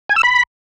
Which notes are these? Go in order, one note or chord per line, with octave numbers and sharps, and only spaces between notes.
G#5
E6
B5